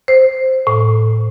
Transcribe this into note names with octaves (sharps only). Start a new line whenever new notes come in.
C5
A2